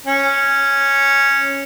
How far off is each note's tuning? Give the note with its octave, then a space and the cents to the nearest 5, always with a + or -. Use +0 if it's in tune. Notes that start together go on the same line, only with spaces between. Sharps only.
C#4 -5